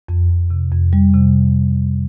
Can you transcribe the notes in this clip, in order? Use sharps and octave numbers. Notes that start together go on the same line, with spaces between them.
F2
F2
C3
F2
G3
C3